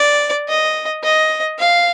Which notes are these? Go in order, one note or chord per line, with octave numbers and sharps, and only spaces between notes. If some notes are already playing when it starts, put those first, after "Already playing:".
Already playing: D5
D#5
D#5
F5